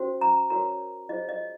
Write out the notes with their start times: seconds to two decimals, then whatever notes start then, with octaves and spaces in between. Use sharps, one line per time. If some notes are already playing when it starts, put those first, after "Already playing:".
Already playing: C#4 F#4 C5
0.21 A#5
0.50 F#4 A#4 C#5 A#5
1.09 F4 G#4 C5 D#5
1.29 D#5